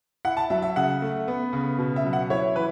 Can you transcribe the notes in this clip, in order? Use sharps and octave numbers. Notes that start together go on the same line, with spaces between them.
E4 F#5
A5
F#3 E5
E5
C#3 F#5
A3
B3
C#3
B2
E5
F#3
F#5
E4 C#5
E3 B4